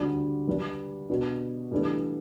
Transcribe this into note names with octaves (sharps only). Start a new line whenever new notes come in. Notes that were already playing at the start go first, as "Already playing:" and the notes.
Already playing: D2 D3 G3 D4
G2 G3 D4
B2 B3 D4
G2 E3 A3 D4